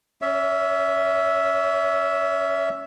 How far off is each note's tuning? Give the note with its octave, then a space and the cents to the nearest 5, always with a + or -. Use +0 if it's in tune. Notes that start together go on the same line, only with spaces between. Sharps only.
C#4 +0 C#5 +35 E5 +0